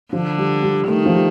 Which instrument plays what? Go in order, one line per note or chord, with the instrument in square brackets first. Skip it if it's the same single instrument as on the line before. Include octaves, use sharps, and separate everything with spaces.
[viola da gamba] D3 [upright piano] F3
[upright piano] G3
G3
[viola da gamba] D#3 [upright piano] A3
[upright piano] F3
G3